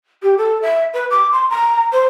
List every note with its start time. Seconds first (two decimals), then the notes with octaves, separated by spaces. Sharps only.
0.23 G4
0.38 A4
0.62 E5
0.93 B4
1.11 D6
1.32 C6
1.50 A#5
1.92 C5